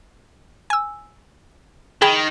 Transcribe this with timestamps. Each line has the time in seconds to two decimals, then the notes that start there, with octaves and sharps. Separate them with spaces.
0.70 G#5 E6
2.02 D#3 G#4 G5 B5